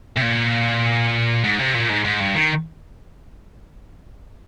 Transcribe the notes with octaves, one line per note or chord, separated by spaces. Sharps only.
C3
A#2
G#2
C3
A#2
G#2
G#2
G2
D#3